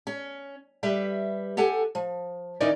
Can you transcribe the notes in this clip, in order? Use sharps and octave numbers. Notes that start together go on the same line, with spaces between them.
C#4
G3 G4 B4 E5
G4 A4 F#5 G#5
F3
D#3 E3 C#4 D#4 A#4 D5